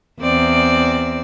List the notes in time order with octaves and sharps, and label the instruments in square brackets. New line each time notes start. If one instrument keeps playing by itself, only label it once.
[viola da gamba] E2 C4 D5